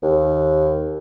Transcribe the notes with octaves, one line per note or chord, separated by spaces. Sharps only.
D#2